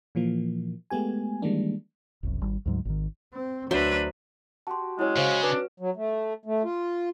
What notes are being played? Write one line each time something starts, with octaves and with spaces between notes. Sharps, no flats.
A#2 E3 F3 A#3
G#3 A3 B3 G4 G#5
D#3 E3 G3 G#3 A#3 D4
F#1 C2 F#2
G#1 G3
D2 G#2 F#3
G#1 D#3
C4
D2 F#3 D4 B4 C5 E5
F#4 G4 A5 C6
F#3 G#3 C#4 E4 C#5
C#3 C5 F5
D4 B4
F#3
A3
A3
F4